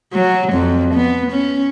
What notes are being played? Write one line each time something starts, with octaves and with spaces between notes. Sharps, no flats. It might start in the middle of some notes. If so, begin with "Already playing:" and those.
F#3
F2
B3
C#4